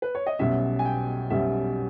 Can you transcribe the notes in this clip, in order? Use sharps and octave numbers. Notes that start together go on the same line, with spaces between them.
B4
C#5
D#5
B1 B2 G3 C#4 E5
G#5
G5
B1 B2 G3 C#4 E5